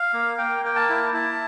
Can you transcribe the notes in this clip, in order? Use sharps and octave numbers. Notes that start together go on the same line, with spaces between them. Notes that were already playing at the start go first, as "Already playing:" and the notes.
Already playing: F5
A#3
A#3 G5
A#3 G5
A5
E4
E4 A5